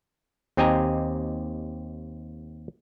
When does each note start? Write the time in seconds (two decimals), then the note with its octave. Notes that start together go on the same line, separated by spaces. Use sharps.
0.57 D#2 C4 G4 D#5 G#5 A#5